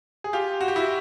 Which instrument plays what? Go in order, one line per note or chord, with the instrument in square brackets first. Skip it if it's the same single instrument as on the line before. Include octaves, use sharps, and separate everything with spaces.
[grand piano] G#4
F4 G4
F#4
G4
E4 F#4